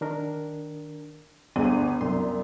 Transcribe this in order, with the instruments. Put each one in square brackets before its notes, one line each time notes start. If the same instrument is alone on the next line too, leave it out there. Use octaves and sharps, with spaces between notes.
[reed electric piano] D#3 D4 A#4
[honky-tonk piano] G1 G#4 D#7 [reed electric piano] D2 G2 [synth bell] B3
[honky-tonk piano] C2 F#2 [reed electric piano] C6